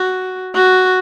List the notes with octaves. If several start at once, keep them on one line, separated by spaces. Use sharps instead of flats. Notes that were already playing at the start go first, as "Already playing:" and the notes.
Already playing: F#4
F#4